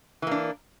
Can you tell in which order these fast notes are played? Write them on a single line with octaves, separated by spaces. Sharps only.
E3 A#3 D4